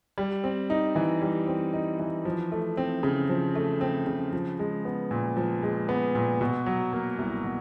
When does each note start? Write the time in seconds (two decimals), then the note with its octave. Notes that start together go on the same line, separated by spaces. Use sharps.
0.18 G3
0.44 C4
0.70 D#4
0.95 E3
1.22 G3
1.47 C4
1.73 D#4
1.99 E3
2.25 F3
2.52 A3
2.77 C4
3.03 C#3
3.29 F3
3.55 A3
3.81 C4
4.07 C#3
4.33 F3
4.59 G#3
4.85 B3
5.11 A#2
5.37 F3
5.63 G#3
5.89 B3
6.15 A#2
6.41 B2
6.66 F#3
6.93 A#3
7.18 C2
7.44 B2